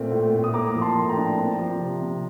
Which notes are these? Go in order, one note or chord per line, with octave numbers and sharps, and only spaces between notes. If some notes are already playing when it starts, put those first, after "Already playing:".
Already playing: A#2 A3 C4
A2
A2
D#6
A#3 A#5 D6
F3
A5 C6
A2
G5 A#5
D4
C4
F3
C3
C3